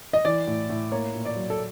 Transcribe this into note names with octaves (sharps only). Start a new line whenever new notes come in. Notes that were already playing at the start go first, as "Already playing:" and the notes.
D#5
E3 D5
A2
A2
A#3 C#5
A#2
D5
F#3
A4